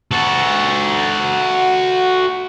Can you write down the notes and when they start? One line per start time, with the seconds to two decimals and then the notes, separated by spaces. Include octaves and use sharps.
0.11 F#4 A4